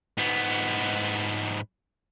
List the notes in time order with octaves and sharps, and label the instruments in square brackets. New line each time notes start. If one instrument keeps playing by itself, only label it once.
[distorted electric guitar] G#2 B3